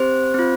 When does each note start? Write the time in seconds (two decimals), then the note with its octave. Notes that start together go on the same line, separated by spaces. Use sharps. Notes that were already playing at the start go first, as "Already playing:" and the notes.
Already playing: C4 G4 C5
0.34 C4 F4